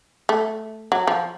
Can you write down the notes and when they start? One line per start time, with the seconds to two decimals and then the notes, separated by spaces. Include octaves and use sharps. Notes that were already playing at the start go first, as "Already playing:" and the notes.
0.29 A3
0.92 F#3
1.07 F3